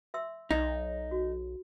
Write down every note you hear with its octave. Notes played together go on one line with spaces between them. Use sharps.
E5 C6 E6
B1 D#4 D5 D#5 A#5
F#4